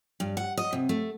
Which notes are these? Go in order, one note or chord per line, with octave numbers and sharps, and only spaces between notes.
G2
F#5
D#5
C3
A3